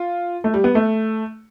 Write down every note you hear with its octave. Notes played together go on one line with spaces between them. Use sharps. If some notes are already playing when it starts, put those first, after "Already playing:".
Already playing: F4
A3
G3
B3
A3